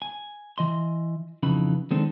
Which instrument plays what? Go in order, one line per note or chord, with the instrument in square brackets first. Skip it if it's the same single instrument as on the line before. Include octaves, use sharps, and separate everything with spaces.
[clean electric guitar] G#5
E3 D#5 C6
F2 C#3 E3 D#4 B5
D#3 G#3 C4 D4 A4